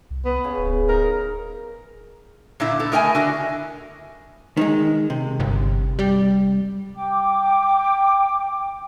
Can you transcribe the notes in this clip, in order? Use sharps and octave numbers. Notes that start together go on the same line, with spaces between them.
C2
B3
C#3
D1
D#4 A#4
A#2 D3 E4
B3 A4
A3 E4 A#4 D#5 G5 G#5
D3 F#4
D#3 G#3
C3
G1
G3
G5 D6